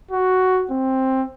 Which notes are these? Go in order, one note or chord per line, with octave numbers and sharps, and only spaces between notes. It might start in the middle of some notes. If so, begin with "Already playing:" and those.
F#4
C4